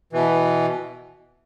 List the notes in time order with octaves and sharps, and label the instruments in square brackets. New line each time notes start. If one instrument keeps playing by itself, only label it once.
[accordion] B2 E3